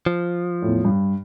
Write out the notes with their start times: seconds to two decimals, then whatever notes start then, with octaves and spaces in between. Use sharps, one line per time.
0.06 F3
0.62 E2 A2
0.85 G2